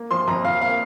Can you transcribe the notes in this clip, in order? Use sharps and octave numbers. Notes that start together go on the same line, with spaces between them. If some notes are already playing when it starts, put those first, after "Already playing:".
Already playing: A#3
F3 C6
F2 A#5
F2 F5
A#3 F5